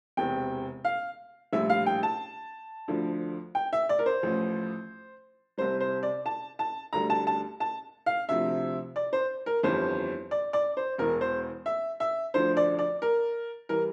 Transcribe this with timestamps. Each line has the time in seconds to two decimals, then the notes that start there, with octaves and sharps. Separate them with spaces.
0.17 E1 E2 C3 G5
0.85 F5
1.53 A#1 A2 G3 E5
1.70 F5
1.86 G5
2.03 A5
2.88 D2 D3 F3
3.55 G5
3.73 E5
3.89 D5
3.99 A#4
4.06 C5
4.23 A1 A2 F3
5.58 C2 C3 G3 C5
5.80 C5
6.03 D5
6.26 A5
6.59 A5
6.93 D2 D3 G3 A#5
7.10 A5
7.27 A5
7.60 A5
8.06 F5
8.29 D2 C3 F3 E5
8.96 D5
9.13 C5
9.46 A#4
9.63 G1 F2 E3 G3 C5
10.31 D5
10.53 D5
10.77 C5
10.98 E1 E2 E3 A#4
11.21 C5
11.66 E5
12.00 E5
12.34 D2 D3 F3 C5
12.57 D5
12.79 D5
13.02 A#4
13.69 E3 G3 A#4